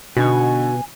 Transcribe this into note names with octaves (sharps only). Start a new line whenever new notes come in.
B2 D3 B3 D#4 F#4 G#5 C#6